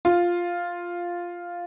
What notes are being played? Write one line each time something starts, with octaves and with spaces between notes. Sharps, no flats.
F4